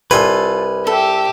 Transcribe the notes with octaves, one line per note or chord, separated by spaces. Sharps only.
C2 F4 G4 A4 B4 G#5
G4 A4 E5